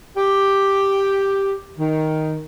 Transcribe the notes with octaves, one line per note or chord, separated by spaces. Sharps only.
G4
D#3